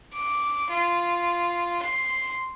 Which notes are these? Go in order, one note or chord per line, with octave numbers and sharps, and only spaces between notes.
D6
F4
C6